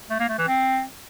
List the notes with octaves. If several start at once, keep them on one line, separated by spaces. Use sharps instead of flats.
A3
A#3
A3
E3
C4